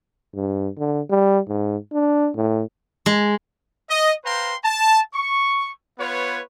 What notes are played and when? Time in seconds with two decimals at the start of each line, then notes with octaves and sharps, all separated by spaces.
0.35 G2
0.79 D3
1.10 G3
1.48 G#2
1.93 D4
2.36 A2
3.06 G#3
3.90 D#5
4.25 B4 C5 F5 G5 A#5 C6
4.64 A5
5.14 C#6
6.00 B3 F4 B4 C#5